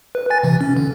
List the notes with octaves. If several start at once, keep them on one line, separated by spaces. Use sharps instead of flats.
B4
G#5 A6
C3 E3
C#4
D3